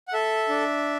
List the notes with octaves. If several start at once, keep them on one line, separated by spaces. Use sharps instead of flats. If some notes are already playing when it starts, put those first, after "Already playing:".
F#5
A4 E5
D4